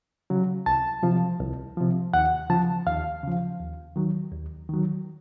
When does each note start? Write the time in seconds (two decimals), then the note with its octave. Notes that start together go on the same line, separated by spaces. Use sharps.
0.30 C#3 F#3
0.66 C2 A5
1.03 C3 F3
1.39 C2
1.77 C3 F3
2.13 D#2 F#5
2.49 C#3 F3 A5
2.87 D#2 F5
3.23 C#3 F3
3.60 D#2
3.96 D#3 F#3
4.32 D#2
4.69 D#3 F#3